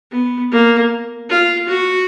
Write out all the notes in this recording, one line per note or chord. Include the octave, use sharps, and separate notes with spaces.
B3
A#3
F4
F#4